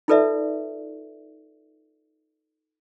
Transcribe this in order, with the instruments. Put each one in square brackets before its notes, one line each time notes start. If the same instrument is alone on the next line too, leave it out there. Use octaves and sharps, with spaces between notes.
[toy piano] D#4 F4 A4 B4 D5 E5